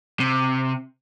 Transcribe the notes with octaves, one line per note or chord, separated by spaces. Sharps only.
C3